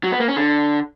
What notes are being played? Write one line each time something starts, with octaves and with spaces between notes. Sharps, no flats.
F#3
B3
A#3
C#4
D3